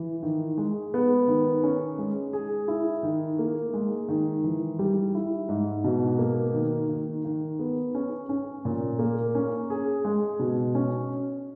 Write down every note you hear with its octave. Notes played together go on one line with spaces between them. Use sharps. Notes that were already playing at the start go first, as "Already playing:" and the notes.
Already playing: E3
D#3
G#3
B3
D#3
C#4
G#3
G#4
E4
D#3
A#3
G#3
D#3
E3
G3
E4
G#2
B2
A#3
D#3
D#3
D#3
B3
C#4
C#4
A#2
A#3
C#4
G#4
G#3
B2
C#4